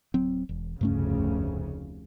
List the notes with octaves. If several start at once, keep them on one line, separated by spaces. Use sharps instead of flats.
D1 F#3 C4
E1
F1 D2 G2 C#3 A3 C#4